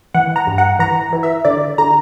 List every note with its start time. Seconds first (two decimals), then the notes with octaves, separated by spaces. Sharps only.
0.14 E3 F#5
0.36 A#5
0.47 G2
0.58 F#5
0.79 E3 A#5
1.13 E3
1.23 E5
1.45 D3 D5
1.78 D3 A#5